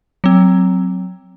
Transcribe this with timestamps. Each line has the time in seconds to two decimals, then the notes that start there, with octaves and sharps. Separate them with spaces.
0.24 F#3 C4